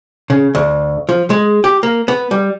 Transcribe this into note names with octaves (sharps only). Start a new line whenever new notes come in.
C#3
D2
F3
G#3
G4
A#3
B3
G3